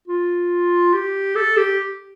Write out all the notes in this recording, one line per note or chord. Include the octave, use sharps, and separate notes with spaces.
F4
G4
A4
G4